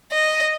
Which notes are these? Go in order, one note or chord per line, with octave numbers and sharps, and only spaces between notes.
D#5